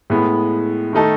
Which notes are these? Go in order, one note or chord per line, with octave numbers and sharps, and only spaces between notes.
A2 G#3 B3
D#3 A3 D#4 A4